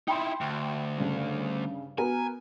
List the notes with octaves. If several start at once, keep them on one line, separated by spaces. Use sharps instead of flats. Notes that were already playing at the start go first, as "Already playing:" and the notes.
D#4 E4 G5 B5 C6
D2
G2 C#3
B3 F#4 A#4 G#5